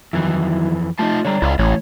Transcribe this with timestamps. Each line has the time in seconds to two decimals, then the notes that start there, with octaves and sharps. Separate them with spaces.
0.13 F2 D#3 E3 F#3 E4
0.99 A3 D#4 F4 E5 A5
1.25 D3 G3 C#5 D5 A#5
1.42 C#2 E4 D#5 F5
1.59 A1 E3 A3 E4 C#5